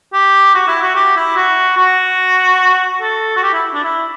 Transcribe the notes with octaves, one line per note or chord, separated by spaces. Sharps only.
G4
F#4
E4
F#4
G4
E4
F#4
F#4
A4
F#4
G4
E4
D4
E4